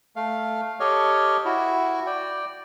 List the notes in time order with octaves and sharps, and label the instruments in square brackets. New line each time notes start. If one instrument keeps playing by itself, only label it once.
[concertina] A3 F5
G4 A4 C#5 D#5 F6
E4 F#4
D5 G5